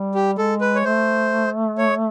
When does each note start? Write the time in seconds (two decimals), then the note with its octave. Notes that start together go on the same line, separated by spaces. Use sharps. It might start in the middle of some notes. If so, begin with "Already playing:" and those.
Already playing: G3
0.15 G4
0.38 G#3 A4
0.61 B4
0.75 C#5
0.84 A3 C5
1.78 C#5